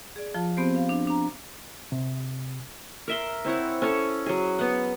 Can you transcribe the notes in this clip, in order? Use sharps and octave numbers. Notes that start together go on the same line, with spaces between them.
G#4 D5
F3 F4 A5
B3 C4 G4 C5
F5
D4
D4 A#5
C3
A#4 E5 C6
C4 E4 C#5 F#5
C#4 A4 C#5
F#3 G#4
B3 F#5